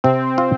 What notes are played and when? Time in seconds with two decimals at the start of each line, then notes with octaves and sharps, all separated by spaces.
0.04 C3 C4
0.38 F4